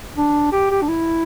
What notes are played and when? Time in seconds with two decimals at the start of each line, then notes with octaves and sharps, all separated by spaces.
0.16 D4
0.52 G4
0.71 G4
0.81 D4
0.89 E4